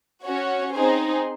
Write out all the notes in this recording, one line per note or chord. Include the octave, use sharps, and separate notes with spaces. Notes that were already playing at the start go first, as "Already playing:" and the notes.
C#4 F#4 C#5
C4 D#4 G#4 C5